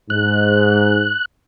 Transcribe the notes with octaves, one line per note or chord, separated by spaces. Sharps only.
G#2 F#6